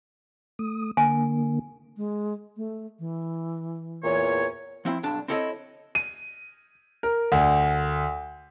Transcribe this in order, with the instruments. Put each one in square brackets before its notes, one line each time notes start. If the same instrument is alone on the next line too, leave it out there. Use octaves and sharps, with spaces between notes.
[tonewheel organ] A3 D#6
[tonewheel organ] D3 A#3 [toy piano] G#5
[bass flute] G#3
A3
E3
[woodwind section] E2 A#2 C#5
[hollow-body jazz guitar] F3 C4 E4
B1 G2 D4 A5
C4 E4 A4 C#5 D#5
[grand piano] D#7
A#4
D2